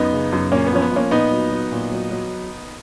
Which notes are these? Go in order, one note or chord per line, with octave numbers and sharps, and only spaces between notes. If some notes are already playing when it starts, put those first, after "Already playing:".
Already playing: F#2 B3 D#4
C#3
F#2
A#2 A#3 C#4
B3
F3 C#4
B3
F3 A#3 C#4
A#2 B3 D#4
F#3
F#3
A#2
F#3
F#3